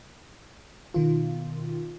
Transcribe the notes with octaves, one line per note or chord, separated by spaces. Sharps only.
B2 D#3 F4